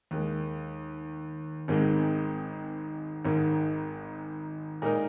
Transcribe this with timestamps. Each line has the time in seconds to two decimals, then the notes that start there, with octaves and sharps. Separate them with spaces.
0.11 D#2 D#3 G#3
1.68 G#1 G#2 D#3 G#3 C4
3.25 G#1 G#2 D#3
4.82 A#2 G#3 D#4 A#4